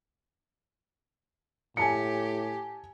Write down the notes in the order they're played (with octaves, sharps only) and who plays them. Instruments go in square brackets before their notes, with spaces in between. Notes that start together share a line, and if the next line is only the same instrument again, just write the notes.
[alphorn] A2 [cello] G4 [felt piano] G#5 A5 C#7